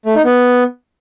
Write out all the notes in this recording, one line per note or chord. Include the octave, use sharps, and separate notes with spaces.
A3
D#4
B3